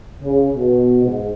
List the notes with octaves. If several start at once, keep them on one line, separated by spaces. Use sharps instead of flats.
C#3
B2
G#2